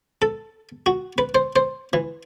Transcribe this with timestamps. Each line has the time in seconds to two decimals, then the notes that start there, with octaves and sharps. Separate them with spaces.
0.22 A4
0.86 F#4
1.18 B4
1.35 C5
1.56 C5
1.93 E3